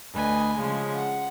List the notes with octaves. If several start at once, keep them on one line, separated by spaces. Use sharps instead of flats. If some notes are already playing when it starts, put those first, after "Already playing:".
D2 B4 D#5 G#5
C#3 F3 G#3
F#5